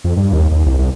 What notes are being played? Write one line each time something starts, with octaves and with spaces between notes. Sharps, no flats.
F2
G2
D#2
D#2
C2
C2